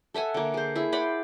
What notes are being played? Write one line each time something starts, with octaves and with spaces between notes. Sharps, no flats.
A4 E5 F#5 G#5
D3 A#3
G#4 C5
E4 G#4
C5 D5 F#5 B5